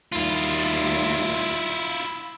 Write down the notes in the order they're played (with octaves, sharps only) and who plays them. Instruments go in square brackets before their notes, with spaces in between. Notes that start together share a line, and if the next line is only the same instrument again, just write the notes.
[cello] D#2 G3 [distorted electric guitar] E4 F4